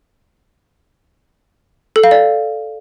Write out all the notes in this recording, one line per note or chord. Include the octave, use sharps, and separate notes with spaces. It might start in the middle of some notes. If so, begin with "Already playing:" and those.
A4
F5
D5